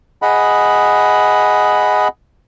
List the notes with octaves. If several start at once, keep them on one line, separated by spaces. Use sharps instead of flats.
G#4 D#5 F#5 B5